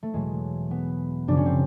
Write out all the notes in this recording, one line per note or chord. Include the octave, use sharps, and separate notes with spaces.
A3
E2 B2 F#3 G#3
B3
F#2 C#3 F3 D4
C#4
C4